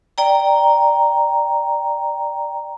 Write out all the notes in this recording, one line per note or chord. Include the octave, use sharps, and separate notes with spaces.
D5 G5 A#5